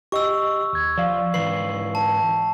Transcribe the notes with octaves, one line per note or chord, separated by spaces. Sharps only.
G4 D#5 C#6 E6
D#2 G#6
F3 D5 F5
G#2 E3 B4 C7
A5